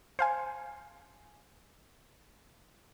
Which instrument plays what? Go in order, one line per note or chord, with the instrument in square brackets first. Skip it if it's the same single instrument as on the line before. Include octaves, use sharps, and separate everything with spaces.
[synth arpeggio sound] C5 F5 G#5